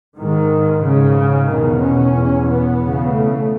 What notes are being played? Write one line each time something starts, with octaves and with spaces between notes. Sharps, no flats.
G#2 D#3
G#2 C#3
E2 B2 D#3
C#4
E2 B2
B3
E2 C#3
A3